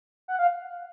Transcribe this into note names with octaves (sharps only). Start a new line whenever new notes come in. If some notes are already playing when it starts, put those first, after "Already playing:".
F#5
F5